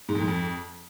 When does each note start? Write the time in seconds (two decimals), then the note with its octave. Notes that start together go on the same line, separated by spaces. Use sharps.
0.09 G#2
0.15 F2
0.21 G#2
0.28 F2